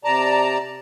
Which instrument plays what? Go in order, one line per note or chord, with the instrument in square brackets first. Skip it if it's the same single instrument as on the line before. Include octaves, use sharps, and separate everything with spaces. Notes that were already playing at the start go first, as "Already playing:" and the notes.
[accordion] C3 D5 A5 A#5